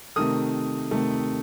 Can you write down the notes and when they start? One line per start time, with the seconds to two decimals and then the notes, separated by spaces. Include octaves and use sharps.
0.16 C3 D#3 A3 D#6
0.91 C3 D#3 A3